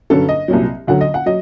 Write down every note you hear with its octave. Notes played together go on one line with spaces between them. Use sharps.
G1 F#2 D3 F#3 A4
D#5
C2 A#2 F#3
D2 D3 F#3 F#5
D#5
F#5
F#3 D#5